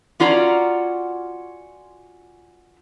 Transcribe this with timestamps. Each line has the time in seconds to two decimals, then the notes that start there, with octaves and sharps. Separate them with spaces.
0.20 C#4 F4 F#4 D5 A#5